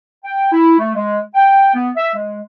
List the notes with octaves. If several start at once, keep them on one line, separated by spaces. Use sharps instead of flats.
G5
E4
A3
G#3
G5
B3
E5
G#3